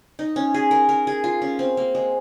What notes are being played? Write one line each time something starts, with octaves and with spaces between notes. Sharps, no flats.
D#4
C#4
G#4
A#4
A#4
G#4
F4
C#4
C4
A#3
G#3